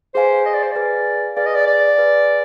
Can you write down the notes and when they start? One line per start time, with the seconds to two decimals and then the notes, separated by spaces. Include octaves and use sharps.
0.15 G#4 B4 C5 F5 G#5
0.46 D#5
0.54 D5
0.63 C5
0.72 G#4 B4 D5 F5 G#5
1.36 G#4 B4 D5 F5 G#5
1.46 D#5
1.55 D5
1.67 D5
1.97 G#4 B4 F5 G#5